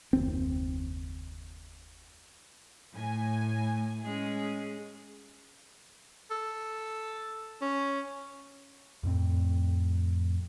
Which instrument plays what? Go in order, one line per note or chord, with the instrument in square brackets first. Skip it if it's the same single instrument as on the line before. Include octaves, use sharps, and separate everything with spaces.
[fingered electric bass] F#1 D#2 C4
[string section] A2 G#5
[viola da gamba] G#3 C#4 G#4
[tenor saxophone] A4
C#4
[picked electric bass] F2 A2 C4